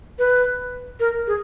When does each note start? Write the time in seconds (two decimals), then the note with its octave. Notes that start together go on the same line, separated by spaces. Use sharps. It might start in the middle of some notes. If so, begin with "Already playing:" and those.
0.19 B4
1.00 A#4
1.27 G#4